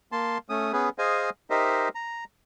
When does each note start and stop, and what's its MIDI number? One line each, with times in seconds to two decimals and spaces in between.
0.12 0.38 58
0.12 0.38 81
0.12 0.38 84
0.49 0.72 57
0.49 0.72 61
0.49 0.72 87
0.73 0.89 59
0.73 0.89 61
0.73 0.89 68
0.73 0.89 71
0.98 1.30 68
0.98 1.30 72
0.98 1.30 75
0.98 1.30 77
0.98 1.30 80
1.50 1.89 63
1.50 1.89 67
1.50 1.89 70
1.50 1.89 72
1.50 1.89 75
1.50 1.89 76
1.95 2.24 82